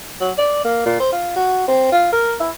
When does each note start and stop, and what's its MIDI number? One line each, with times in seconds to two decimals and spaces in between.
0.21 0.31 54
0.38 0.61 74
0.64 0.82 58
0.86 0.95 46
1.00 1.12 72
1.12 1.32 65
1.36 1.63 66
1.68 1.88 60
1.92 2.12 65
2.13 2.35 70
2.40 2.50 64